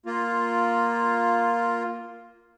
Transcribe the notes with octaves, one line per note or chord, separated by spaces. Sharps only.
A#3 F4